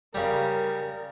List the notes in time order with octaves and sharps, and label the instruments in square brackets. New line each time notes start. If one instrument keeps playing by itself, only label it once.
[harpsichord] C#3 G3 [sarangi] A#4